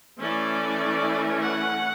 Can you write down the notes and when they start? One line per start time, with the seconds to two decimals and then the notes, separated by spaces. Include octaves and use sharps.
0.20 E3 A3 C#4 D5
1.43 F#5